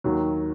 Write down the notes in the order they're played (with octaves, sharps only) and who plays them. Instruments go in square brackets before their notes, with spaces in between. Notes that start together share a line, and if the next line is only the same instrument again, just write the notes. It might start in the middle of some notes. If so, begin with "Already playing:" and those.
[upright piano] D#2 D#3 F#3